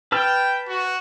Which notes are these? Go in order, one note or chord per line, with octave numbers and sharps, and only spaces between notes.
B4 G5 A5 F6
F#4